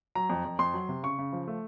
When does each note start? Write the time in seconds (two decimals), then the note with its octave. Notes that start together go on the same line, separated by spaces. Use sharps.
0.15 F#3 A#5
0.30 F2
0.45 F2
0.59 F2 C6
0.74 F#3
0.89 C3
1.03 C#3 C#6
1.18 C#3
1.33 F3
1.48 A3